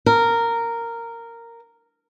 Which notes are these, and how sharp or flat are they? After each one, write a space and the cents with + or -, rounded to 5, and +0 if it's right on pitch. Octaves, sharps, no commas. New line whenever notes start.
A#4 -10